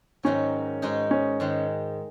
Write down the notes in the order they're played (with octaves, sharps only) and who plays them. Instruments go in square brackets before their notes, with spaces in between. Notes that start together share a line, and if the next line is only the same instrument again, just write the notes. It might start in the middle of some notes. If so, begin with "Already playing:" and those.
[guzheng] G#2 D#3 F#3 D#4 F#4 [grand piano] C#4
[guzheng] G#2 G#3 D#4 F#4
[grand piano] C#4
[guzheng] G#2 D#3 G#3